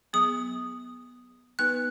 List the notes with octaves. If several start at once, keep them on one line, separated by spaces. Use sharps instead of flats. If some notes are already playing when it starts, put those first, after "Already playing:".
F#3 B3 G#4 D#6
B3 D#4 B4 F#6